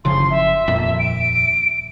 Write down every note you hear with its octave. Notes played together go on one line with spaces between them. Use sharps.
F#1 C#3 F3 C6
E5
D#1 F2 A#2
D7